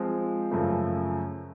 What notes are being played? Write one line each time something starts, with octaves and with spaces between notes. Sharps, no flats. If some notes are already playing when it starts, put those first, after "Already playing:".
Already playing: F3 G#3 C4 F4
F#2 C#3 F3 A3